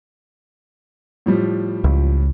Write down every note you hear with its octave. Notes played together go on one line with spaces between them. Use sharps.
A2 F3 G3
C#2